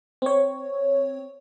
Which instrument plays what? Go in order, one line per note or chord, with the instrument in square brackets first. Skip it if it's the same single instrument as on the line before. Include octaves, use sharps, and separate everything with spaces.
[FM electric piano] C4 C#5